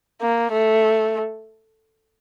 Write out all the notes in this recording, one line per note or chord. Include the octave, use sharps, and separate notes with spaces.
A#3
A3